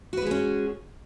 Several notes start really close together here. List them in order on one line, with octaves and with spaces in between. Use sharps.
F#4 B4 G#3 G#4 C#4